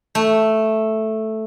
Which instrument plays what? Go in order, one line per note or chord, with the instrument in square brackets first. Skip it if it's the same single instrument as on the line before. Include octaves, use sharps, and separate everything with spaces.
[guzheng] A3